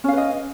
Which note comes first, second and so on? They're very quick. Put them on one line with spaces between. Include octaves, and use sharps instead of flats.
C#4 F5 B4 D#5